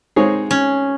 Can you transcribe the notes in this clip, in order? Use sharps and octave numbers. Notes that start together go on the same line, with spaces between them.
G#3 C4 D#4 G#4 C#5
C#4